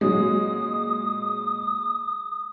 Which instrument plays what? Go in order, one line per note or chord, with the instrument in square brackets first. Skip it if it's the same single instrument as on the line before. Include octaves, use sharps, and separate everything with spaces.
[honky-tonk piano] A#2 F#3 G#3 [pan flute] D#6